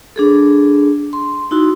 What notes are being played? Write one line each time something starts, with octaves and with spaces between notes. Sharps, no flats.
D4 G#4 A4
C6
D#4 E4 F#4 C6